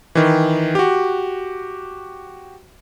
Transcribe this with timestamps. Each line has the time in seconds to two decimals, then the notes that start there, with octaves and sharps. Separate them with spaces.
0.15 D#3 E3
0.75 F#4 G4